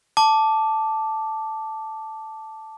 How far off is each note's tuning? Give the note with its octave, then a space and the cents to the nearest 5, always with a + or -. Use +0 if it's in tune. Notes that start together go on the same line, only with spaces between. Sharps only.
A5 +0 D6 +0